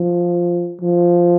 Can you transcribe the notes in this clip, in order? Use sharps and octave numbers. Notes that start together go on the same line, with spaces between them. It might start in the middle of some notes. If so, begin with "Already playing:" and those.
Already playing: F3
F3